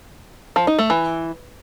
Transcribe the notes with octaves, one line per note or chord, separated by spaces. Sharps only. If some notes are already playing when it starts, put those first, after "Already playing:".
F3
D#4
A3
E3